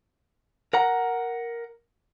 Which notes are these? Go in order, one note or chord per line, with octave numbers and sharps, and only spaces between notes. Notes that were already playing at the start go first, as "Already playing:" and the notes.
A#4 F#5 A#5